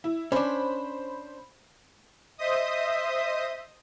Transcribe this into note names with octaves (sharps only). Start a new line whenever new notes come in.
E4
C#4 D4 C5 B5
C5 D#5 E5 D#6